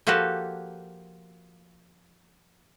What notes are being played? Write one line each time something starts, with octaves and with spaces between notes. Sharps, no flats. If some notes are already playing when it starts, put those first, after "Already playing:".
F3 A#3 F#4 G4 A4 B4